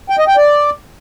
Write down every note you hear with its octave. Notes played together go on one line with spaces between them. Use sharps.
G5
D#5
G5
D5